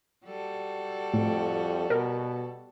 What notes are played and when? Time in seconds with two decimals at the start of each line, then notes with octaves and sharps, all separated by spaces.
0.25 G3 F#4 A4
1.14 F2 A2
1.90 B2 A#4